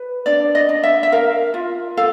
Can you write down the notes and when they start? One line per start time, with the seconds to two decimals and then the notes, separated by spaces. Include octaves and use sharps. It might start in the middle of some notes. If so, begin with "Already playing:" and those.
Already playing: B4
0.26 D4 D5
0.55 D#5
0.69 D4
0.84 E5
1.03 E5
1.12 A#4 F5
1.54 F4
1.97 A4 F5